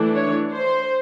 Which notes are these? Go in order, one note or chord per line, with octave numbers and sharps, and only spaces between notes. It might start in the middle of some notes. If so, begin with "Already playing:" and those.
Already playing: E3 A3 D4
C#5
C5